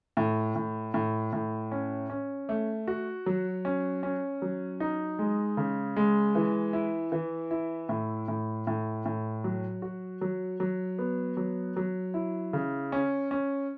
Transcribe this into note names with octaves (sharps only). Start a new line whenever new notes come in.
A2
A2
A2
A2
C#4
C#4
A3
F#4
F#3
C#4
C#4
F#3
D#4
G#3
C#3
G#3
E3
E4
E3
E4
A2
A2
A2
A2
F#3
F#4
F#3
F#3
B3
F#3
F#3
E4
C#3
C#4
C#4